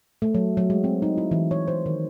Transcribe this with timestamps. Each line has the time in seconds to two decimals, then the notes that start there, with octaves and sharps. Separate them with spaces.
0.22 A3
0.35 F#3
0.57 F#3
0.70 G#3
0.84 C4
1.02 D#4
1.17 E4
1.31 E3
1.51 C#5
1.68 C5
1.86 D#3